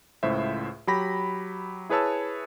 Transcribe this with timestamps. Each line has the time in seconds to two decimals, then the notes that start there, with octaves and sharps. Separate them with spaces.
0.23 C#2 A2 C5 E5
0.87 F#3 G4 B5 A#6
1.89 E4 G#4 B4 C#5 A5 E6